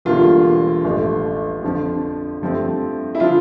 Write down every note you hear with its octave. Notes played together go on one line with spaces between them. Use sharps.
E1 E2 D3 G3 A#3 F4
A1 G2 F3 A3
F2 D3 F3
G2 F3 A3 C4
E4
D3 F3 F4